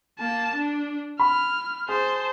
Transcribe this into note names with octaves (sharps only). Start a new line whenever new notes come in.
A#3 A5
D4
B5 F6
G#4 C5 A5